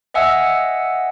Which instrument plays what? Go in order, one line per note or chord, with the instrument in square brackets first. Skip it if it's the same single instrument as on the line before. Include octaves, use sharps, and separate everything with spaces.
[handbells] D#5 E5 F#5 G#5 E6